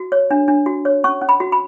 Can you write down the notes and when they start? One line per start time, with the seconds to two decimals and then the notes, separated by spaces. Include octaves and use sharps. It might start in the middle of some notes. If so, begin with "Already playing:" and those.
Already playing: F#4
0.12 C#5
0.31 D4
0.48 D4
0.66 F#4
0.85 C#5
1.04 C#4 C#6
1.21 C#4
1.29 B5
1.40 F#4
1.52 B5